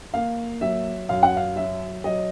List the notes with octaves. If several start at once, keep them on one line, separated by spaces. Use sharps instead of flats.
A#3 F5
F#3 E5
F#2 F5
F#5
F5
F#3 E5
F#3 D#5